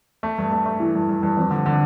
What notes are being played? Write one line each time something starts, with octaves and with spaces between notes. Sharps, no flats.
A3
G2
A3
A3
E3
G2
G2
G2
F2
D3
D3